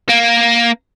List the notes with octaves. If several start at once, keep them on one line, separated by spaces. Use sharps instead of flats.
A#3